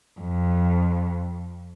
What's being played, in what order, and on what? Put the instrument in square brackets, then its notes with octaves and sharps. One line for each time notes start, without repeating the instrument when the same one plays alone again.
[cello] F2